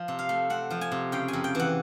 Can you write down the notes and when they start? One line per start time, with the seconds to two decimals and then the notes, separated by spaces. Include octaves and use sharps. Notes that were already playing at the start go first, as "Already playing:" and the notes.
Already playing: F3
0.08 C3
0.19 F5
0.29 A3
0.50 C4 F#5
0.71 F3
0.81 G#5
0.92 C3
1.12 C#3 G5
1.28 G#5
1.33 F2
1.44 G5
1.55 E3 F#5